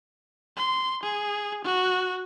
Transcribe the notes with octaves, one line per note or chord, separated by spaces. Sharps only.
C6
G#4
F#4